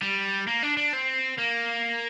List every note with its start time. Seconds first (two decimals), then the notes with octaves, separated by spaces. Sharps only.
0.02 G3
0.48 A#3
0.63 D4
0.77 D4
0.93 C4
1.39 A#3